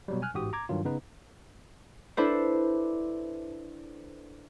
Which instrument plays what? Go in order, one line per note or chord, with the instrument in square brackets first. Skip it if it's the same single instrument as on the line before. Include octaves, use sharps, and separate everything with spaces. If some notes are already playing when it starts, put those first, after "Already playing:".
[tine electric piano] B2 F#3 G3
G#5 F6 F#6
A1 G#2 F#4 G4 D#6
A#5 D6 G#6
G2 D#3 F#3 F4
C#3 B3 D#4 B4
[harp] D4 E4 A4 B4 C5